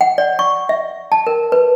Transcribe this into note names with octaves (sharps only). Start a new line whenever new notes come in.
F#5
D5
C#6
E5
A5
A#4
B4